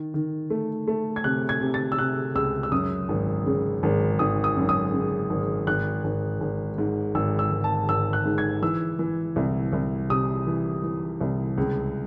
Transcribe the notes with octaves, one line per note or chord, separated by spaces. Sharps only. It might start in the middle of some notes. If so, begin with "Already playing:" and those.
Already playing: D#3
D#3
A3
A3
G#6
C3 F#6
G#6
C3
A6
E6
C3 F#6
C#2 E6
E6
F#2 D#6
G#1
C#3
G#1
G#1 D#6
D#6
F#2
D#6
C#3
G#1
G#1 F#6
G#1
G#1
G#2
G#1 E6
E6
G#1
A5
G#1 E6
F#6
G#2
G#6
E3 E6
E3
C2
C2
C3 D#6
E3
E3
C2
C#2